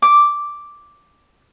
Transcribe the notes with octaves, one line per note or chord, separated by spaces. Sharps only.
D6